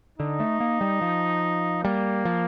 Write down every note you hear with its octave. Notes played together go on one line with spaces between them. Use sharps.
D3 D#4
A3
A#3
G3
F3
G3 A#3
F3